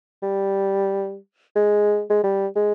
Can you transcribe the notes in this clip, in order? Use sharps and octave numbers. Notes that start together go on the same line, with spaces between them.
G3
G#3
G#3
G3
G#3